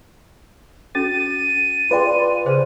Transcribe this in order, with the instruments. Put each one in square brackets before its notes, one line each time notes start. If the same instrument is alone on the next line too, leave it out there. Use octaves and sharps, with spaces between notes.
[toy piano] C#4 F#4 A4 [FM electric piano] A6 [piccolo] D#7
[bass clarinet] F4 [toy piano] G#4 G5 [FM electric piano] B4 D5
[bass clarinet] C#3 [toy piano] G#4 C5